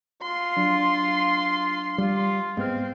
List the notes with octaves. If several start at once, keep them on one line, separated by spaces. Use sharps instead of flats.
F4 C6
F#3 D4
G3 F4
G#2 G#3 B3 C4 F6